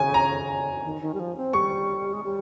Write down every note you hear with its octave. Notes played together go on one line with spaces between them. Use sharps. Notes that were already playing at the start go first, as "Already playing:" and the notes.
Already playing: C#3 G#5
A#5
D#3
D#3
G3
F3
C4
G3 C#6
G#3
G3